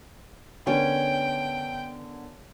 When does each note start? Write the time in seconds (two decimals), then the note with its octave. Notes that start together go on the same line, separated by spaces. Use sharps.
0.67 D3 B3 C#4 A#4 G5